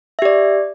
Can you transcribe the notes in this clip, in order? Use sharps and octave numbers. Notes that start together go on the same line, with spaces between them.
G4 D5 E5